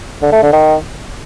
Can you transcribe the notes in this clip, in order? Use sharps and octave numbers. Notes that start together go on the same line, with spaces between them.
D3
A3
D3
D#3